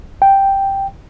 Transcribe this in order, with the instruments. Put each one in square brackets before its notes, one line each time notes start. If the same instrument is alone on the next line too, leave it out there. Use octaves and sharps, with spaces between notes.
[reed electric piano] G5